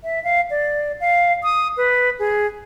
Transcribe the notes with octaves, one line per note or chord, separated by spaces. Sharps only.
E5
F5
D5
F5
D#6
B4
G#4